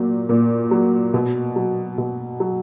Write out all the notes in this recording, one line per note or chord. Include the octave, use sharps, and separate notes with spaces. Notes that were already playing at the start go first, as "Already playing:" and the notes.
Already playing: A#2 F#3
A#2
F#3
B2
F#3
B2
F#3